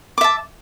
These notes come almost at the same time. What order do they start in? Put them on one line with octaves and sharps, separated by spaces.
D6 E5 A5